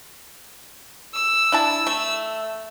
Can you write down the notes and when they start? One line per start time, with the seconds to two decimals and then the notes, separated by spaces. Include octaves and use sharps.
1.14 E6
1.52 D4 E4 A5
1.87 A3